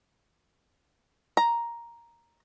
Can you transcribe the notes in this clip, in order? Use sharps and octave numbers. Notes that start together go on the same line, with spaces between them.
A#5